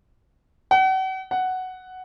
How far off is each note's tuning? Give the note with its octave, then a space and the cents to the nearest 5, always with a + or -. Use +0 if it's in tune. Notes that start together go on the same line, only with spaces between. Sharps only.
F#5 +40
F#5 +5